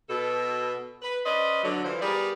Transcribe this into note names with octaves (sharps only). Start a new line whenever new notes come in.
B2 A4
B4
C#4 B4 C5 D5 D#5
D3 F#3
E3 F3 C5
G3 B3 G#4 A#4 B4 D5